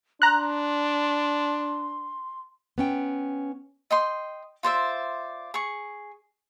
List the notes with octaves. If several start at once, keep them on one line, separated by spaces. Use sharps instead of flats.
D4 A#5 C6 F#6
B3 C#4 G5
D#5 G5 C6
F4 C5 D5 E5
G#4 C#6